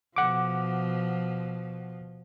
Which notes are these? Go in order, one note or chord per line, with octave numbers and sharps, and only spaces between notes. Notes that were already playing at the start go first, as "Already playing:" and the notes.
B2 F3 F#5 D6